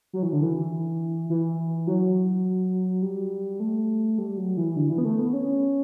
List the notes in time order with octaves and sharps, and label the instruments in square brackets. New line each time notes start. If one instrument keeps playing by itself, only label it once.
[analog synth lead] F#3
E3
D3
E3
E3
F#3
G3
A3
G3
F#3
E3
D3
E3
B3
A3
B3
C#4